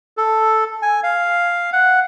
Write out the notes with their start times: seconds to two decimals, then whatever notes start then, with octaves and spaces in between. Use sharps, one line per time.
0.17 A4
0.82 G#5
1.03 F5
1.73 F#5